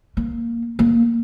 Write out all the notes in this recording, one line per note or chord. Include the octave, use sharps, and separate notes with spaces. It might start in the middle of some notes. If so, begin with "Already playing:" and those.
A#3
A#3